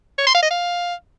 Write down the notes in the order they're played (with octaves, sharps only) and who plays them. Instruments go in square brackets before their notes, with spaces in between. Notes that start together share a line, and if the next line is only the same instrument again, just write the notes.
[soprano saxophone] C#5
C6
F5
D#5
F5